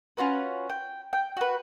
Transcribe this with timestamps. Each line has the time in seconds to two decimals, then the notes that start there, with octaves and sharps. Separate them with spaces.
0.17 C#4 F4 F#4 B4
0.70 G5
1.13 G5
1.37 F#4 B4